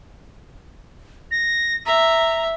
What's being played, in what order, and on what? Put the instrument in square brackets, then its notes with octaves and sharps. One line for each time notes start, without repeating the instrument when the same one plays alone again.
[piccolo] A#6
[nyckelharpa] E5 [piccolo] A#5